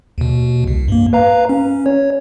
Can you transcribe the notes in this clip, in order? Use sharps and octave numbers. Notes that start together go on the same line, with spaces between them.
D#2 B2
C2
G2 A#3
B4 F5 A#5
C#4
C#5